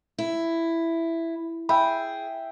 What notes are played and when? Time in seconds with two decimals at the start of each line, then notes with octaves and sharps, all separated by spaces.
0.18 E4
1.69 G#4 E5 G5 B5